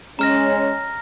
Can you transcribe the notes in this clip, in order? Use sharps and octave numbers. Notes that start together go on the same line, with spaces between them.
G#3 C#4 A#5 F6 A#6